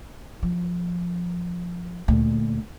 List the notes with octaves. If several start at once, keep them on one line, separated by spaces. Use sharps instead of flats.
F3
D2 A#2